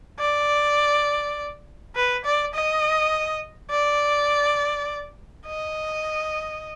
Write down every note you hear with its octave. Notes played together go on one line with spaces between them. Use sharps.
D5
B4
D5
D#5
D5
D#5